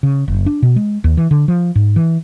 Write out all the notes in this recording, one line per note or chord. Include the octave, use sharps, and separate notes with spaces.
C#3
F#1
D4
B2
G#3
D#2
E3
D3
F3
G#2
E3